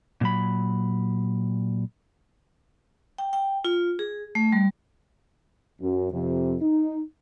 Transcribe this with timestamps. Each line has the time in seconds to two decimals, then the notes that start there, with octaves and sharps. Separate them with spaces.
0.21 A#2 F#3 B5
3.18 G5
3.33 G5
3.65 F4
3.99 G#4
4.35 A3
4.52 G3
5.81 F#2
6.12 F2 C3
6.62 D#4